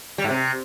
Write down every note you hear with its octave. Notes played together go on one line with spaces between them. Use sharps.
G3
G#2
C3